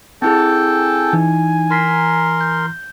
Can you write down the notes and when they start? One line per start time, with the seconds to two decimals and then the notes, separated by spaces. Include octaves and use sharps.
0.22 C4 E4 G#4 A4 G5 A5
0.64 G#5
1.13 E3 D#4
1.71 A#4 A#5 C6 B6 C7
2.41 G6